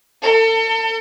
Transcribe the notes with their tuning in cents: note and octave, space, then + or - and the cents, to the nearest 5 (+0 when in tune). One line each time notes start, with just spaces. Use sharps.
A4 +35